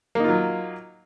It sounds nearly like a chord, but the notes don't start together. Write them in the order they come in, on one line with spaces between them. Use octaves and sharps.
A#3 D#4 F4 F#3